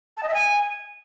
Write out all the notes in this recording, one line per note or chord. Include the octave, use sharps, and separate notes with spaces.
A5
D#5
E5
G#5